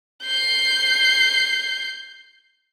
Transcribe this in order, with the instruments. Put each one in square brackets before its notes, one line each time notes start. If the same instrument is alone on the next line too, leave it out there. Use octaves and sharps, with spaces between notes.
[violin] G6 C7